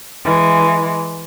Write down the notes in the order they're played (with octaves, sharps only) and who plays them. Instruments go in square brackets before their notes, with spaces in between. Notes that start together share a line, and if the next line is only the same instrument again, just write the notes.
[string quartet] E3 G#3